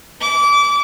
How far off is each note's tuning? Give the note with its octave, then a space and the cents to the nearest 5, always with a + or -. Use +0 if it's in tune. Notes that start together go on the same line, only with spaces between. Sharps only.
D6 -30